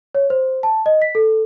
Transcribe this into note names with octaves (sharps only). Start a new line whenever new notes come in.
C#5
C5
A5
D#5
B6
A4